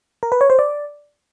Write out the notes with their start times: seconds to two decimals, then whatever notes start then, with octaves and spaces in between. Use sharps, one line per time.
0.23 A#4
0.32 B4
0.41 C#5
0.50 C5
0.59 D5